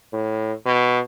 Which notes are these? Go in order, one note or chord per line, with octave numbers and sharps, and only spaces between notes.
A2
B2